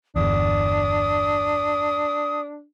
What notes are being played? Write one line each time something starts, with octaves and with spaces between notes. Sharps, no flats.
G1 E2 D4 D#6